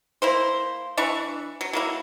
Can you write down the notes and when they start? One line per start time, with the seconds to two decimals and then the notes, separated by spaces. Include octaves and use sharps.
0.22 A#3 E4 C5
0.97 E3 D4 E4 C#6
1.61 F#3
1.73 F#3 A#3 E4